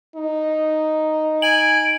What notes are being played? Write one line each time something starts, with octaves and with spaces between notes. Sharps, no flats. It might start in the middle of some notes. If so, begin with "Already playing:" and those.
D#4
G#5 D7 F#7